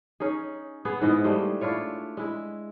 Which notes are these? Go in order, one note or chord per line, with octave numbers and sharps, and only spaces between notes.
C#4 D#4 G#4
B3 G#4
G#2 E3 B3 D#5
G3 A3 G#4 C5
D4 E4 F4 C#5
G#3 E4